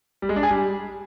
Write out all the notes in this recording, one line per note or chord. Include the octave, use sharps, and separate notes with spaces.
G3
G#3
D4
G#4
G3